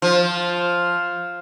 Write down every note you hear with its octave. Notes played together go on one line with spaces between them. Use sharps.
F3